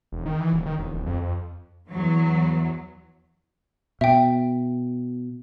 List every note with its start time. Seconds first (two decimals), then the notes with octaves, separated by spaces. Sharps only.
0.12 E1
0.26 D#3
0.40 E3
0.53 D#1
0.66 D#3
0.78 E1
0.94 D1
1.06 F2
1.22 F2
1.90 E2 E3 F#3
4.01 B2 E5 G5